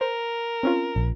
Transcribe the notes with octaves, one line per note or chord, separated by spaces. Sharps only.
A#4 C5
C4 C#4 F4
A#1